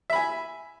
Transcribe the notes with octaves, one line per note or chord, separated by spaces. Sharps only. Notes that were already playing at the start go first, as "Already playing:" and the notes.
E5 G#5 B5